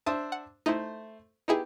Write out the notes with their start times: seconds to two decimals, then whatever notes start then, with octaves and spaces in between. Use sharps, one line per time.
0.06 D4 C5 E5 A5 D#6
0.32 F#5
0.66 A3 D#4 E4 C5 C6
1.48 B3 D#4 E4 G4 G#4